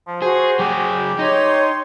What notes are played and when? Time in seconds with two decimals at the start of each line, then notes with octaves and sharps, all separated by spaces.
0.07 F3
0.22 F#4 G#4 C5
0.59 F#3 G4 G#4
1.19 D#4 C#5 C6